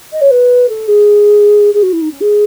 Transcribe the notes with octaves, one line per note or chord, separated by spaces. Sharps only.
D#5
C#5
B4
A4
G#4
G#4
F#4
E4
D#4
C#4
G#4